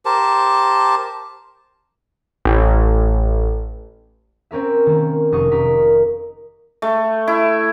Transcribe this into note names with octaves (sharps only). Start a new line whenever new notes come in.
G4 A#4 C5 A5
A1
C4 C#4 A#4 E5
D#3 A#3
F1 D#4 A#4 D#5 C#6 D#6
F1 D#4 A#4 D#6 B6
A3
E4